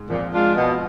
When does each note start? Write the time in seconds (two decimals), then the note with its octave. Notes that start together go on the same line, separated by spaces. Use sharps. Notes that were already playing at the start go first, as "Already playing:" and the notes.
Already playing: G#2 G#3
0.09 F2 A#2 F3
0.33 G#3 D4 F4
0.55 B2